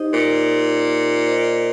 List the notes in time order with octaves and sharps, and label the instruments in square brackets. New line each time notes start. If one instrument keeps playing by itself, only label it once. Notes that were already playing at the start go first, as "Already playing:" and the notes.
Already playing: [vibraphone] D#4 G4 C5 D#5
[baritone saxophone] A#2
[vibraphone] F4 C5 D#5